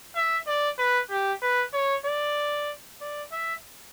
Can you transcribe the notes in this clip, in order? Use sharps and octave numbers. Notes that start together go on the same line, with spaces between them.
E5
D5
B4
G4
B4
C#5
D5
D5
E5